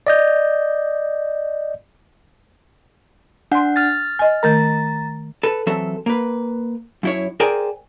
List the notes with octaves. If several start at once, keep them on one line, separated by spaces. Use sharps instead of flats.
D5 D#5 G6
D4 F#5 G#5 C6
F6 A6
D#5 G#5
D#3 A3 A#4 A#5 A6
A4 B4
E3 F#3 C4 A4 E5
A#3 B4
F#2 E4 C#5
G#4 A#4 C5 D5 G5 G#5